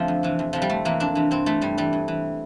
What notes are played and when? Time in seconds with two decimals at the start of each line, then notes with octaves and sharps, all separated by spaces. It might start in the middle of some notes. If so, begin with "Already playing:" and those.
Already playing: D3 F3 A3 C4
0.08 F2
0.23 C3 E3
0.39 F2
0.53 C3 E3 F3
0.62 G3
0.69 F2 A3
0.85 C3 E3 A#3
1.00 F2 D4
1.15 C3 E3
1.31 G2 C4
1.46 E3 A3
1.61 G2 G3
1.78 E3 G3
1.93 G2
2.08 E3